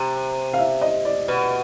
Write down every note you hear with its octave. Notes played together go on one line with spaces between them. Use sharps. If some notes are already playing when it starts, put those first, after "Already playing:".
Already playing: C3
F5
E5
D#5
D5
B2